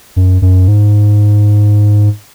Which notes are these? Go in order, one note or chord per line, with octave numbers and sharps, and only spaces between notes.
F#2
F#2
G#2